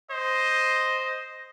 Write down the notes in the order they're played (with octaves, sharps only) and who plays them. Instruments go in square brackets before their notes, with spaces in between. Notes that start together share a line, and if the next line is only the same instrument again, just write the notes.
[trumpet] C5 [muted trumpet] D#5